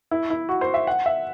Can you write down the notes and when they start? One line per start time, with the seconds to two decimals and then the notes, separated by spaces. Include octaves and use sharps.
0.11 E4
0.30 E4
0.49 F#4
0.61 C5
0.74 E5
0.87 F#5
1.06 E5